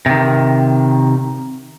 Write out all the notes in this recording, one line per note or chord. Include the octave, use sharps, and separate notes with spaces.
C3 D#3